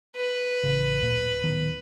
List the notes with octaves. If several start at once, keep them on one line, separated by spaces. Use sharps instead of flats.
B4
A1 C#3
D1 A#2
D1 D#3 B3